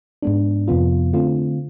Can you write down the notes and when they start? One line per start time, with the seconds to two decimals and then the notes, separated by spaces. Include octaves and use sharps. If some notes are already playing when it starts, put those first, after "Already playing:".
0.22 G#2 G#3 B3 D4
0.68 F2 C3 F3 B3 F4
1.13 D3 A3 C4 F4